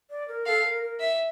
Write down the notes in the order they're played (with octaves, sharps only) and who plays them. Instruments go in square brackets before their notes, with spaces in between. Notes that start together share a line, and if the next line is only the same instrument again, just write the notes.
[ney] D5
A#4
[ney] A4 [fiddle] F5
[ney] A#4
A#4
[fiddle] E5